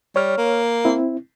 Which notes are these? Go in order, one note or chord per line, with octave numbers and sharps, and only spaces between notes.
G3 C#5 F6
A#3
C4 E4